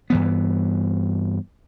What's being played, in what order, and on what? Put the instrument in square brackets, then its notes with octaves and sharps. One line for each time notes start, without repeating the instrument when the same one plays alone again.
[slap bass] G2 E3 B3